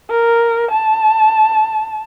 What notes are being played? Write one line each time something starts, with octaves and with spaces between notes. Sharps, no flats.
A#4
A5